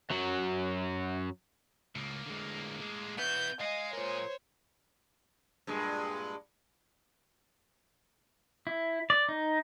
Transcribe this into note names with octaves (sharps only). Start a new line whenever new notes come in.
F#2 F#3
C#2 A2 A#3
D3 G#3
G#3
B3 F#4 B4 E5 G6
G#3 D#5 F5 G#5
F4 A#4 C5 C#5
G2 A#2 G#3
E4
D5
D#4